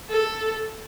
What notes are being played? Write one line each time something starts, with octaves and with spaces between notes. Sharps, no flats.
A4